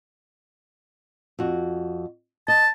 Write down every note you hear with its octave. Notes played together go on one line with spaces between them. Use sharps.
F2 F#4
D#5 A5